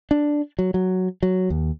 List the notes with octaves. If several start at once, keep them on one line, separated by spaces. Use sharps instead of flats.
D4
F#3
F#3
F#3
D#2